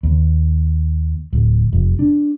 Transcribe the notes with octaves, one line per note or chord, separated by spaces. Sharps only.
D#2
D1
F1
D4